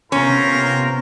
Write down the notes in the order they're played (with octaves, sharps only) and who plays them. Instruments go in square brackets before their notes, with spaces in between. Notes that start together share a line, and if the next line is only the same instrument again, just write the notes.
[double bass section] C3 B3 [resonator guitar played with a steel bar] C#4 [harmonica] F4 A#4 C5